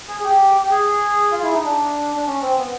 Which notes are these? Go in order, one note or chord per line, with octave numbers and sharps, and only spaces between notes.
G#4
G#4
G4
G4
G#4
F4
E4
D#4
D4
D4
C#4
C4
B3